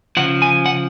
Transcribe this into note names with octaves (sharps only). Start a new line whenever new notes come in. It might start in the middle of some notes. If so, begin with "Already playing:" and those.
C#3 F3 F#5
G#5
F#5